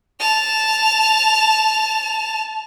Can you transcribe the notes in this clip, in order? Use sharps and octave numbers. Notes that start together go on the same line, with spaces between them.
A5 F7